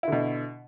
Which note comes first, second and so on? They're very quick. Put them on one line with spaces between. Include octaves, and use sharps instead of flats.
E4 D3 B2